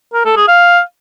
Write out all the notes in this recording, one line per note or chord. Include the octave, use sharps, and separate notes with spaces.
A#4
A4
G#4
F5